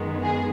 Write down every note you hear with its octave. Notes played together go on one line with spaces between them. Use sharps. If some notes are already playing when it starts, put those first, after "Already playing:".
Already playing: F#2 D#3 G#3 B3
G#4